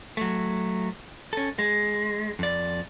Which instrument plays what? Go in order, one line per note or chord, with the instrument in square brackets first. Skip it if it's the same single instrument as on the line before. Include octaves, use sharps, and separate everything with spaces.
[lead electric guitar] F#3 A3
C#4 A4
G#3
F2 D5